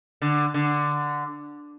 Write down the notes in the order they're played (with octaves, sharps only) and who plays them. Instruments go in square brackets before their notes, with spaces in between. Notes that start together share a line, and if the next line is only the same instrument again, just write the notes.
[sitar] D3
D3